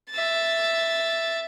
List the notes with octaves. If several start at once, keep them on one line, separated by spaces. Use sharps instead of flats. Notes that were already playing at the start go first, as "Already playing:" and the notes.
E5 A6